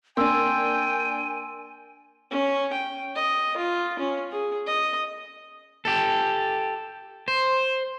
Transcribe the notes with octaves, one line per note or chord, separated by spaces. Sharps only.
A#3 D4 G5 G#5 C6 E6
C#4
G5
D#5
F4
C#4
G#4
D#5
G4 A4
C5